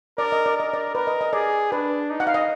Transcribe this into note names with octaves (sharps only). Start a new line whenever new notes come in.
A#4 D5
D#5
D5
A#4 D#5
D5
A#4 B4
D#5
D#5
G#4 D5
D4 B4
D#4
F#5
F5
D#5